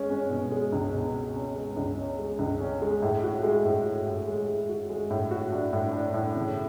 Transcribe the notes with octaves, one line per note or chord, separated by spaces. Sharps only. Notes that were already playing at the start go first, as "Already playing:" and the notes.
Already playing: G#3 C#4
C#4
B2
G#3
C#2
B2
C#4
C#4
G#3
C#2
C#4
G#3
C#2
C#4
G#3
A2
F#4
G#3
A2
F#4
A2
G#3
G#3
F#4
G#3
A2
F#4
D4
A2
D4
A2
C#3